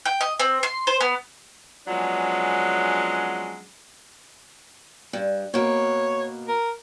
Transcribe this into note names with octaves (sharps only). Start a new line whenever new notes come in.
G5
D#5
C4
C6
C5
B3
F3 F#3 G#3 B3 C#4 D4
G2
B2 A#3 C#5
A#4